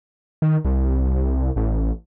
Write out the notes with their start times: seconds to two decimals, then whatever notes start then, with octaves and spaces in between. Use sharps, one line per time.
0.42 D#3
0.65 C2
1.56 A1